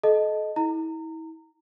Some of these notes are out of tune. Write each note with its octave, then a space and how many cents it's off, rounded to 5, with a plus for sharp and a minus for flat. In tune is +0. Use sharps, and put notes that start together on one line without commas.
A4 -35 D#5 +0 A5 +5
E4 -35 A#5 -25